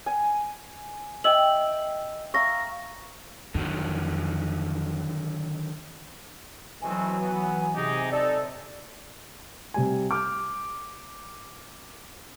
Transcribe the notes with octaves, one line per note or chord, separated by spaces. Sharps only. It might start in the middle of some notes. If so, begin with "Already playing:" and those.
G#5
D#5 E5 G5 E6 F#7
E5 F5 A#5 C#6 A#6
F2 D3 D#3 F#3
B2 E3 F#3 A3 C4 G#5
B3
C3 D#4 G4 G#4
D#4 A4 D5
C3 G3 G#5
D6 F6 G6